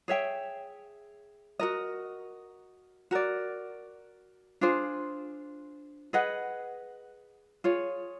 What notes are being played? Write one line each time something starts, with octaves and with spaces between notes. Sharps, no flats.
G#4 C#5 E5 G5
F#4 A#4 D#5
F#4 A#4 D5
D4 F4 G#4 C5
G#4 B4 D#5 F#5
F4 G#4 C#5